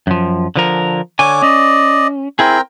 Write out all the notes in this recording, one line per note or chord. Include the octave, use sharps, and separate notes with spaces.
F#2 F3
D3 F3 A#4
D3 C#5 G#5 D6
C#4 D5 D#5
C4 E4 G#4 A#4 G5